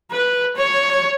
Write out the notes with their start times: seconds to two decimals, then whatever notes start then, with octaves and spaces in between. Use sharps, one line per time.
0.12 B4
0.57 C#5